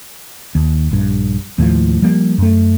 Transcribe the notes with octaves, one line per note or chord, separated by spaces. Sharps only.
D#2
A#1 G2
D#2 A2 E3 F3
F3 G3 A#3
F#2 A3